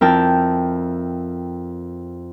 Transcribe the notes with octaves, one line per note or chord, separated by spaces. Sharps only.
F2 E4 A#4 G5 A5